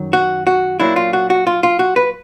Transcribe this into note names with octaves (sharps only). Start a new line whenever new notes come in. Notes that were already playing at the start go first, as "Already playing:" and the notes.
Already playing: F#2 D#3 F#3
F#4
F#4
A#2 F#3 A#3 D4 E4
F4
F#4
F#4
F4
F4
F#4
B4